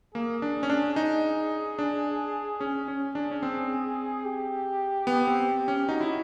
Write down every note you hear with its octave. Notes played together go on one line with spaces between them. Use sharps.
A#3 G#4
D4
C#4
D4
D#4
D4
C#4 G#4
C#4
D4
C#4
C4
G4
B3
C4
C#4
D#4 F#4
E4